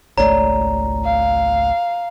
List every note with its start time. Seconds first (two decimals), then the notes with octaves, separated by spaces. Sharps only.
0.18 G#1 C#2 A3 C#5 D5 A#5
1.04 F5